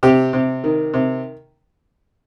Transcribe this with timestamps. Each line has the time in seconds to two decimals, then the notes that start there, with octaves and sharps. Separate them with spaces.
0.03 C3 G4
0.33 C3
0.64 D#3
0.94 C3